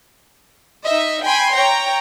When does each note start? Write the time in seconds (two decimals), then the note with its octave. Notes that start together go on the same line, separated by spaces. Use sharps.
0.84 D#4 D#5 E5
1.23 G5 G#5 B5 C6
1.52 C#5 G5 A#5